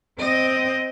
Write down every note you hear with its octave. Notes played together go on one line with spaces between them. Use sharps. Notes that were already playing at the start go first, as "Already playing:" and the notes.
C4 D#5